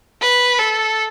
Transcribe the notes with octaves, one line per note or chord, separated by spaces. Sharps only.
B4
A4